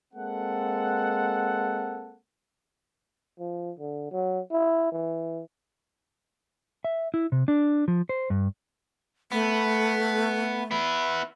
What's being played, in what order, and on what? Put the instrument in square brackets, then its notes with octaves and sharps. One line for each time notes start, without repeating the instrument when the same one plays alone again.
[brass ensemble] G#3 A#3 C4 A4 F#5
[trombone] F3
D3
F#3
E4
E3
[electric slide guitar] E5
E4
C3
D4
F3
C5
G2
[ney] A3 [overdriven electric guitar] B3
[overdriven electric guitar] B3 E4